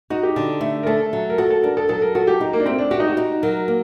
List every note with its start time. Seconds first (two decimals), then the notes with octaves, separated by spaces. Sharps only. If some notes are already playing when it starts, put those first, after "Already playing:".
0.10 D#4 F#4
0.23 G4
0.36 D3
0.61 A3
0.83 A#4
0.87 A3 A4
1.13 F#3
1.30 A#4
1.38 F#4 A4
1.50 A4
1.63 D4 A#4
1.77 A4
1.89 F#3 A4
2.02 A#4
2.15 F#4 A4
2.27 G4
2.41 D#4
2.53 A#3
2.60 D4
2.66 A3 C4
2.79 D4
2.91 F#4 G4
3.00 D#4
3.08 F#4
3.17 D#4
3.42 F#3 A#4
3.68 A#3